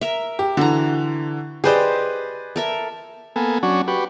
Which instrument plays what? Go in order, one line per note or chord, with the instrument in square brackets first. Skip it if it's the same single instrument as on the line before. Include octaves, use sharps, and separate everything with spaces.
[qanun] A#4 E5
[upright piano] G4
[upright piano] D3 E3 [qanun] F#4 A#5
[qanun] G4 C5 D#5 [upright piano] G#4 B4 D5
[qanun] A4 A#4 E5
[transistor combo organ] A#3 B3 A4 G#5
F#3 C#4 D4 F#4
F#4 G4 B4